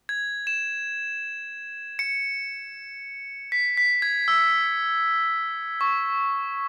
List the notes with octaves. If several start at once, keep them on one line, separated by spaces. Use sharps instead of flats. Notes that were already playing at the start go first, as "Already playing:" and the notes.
G#6
E7
C#7
B6
B6
G#6
E6
C#6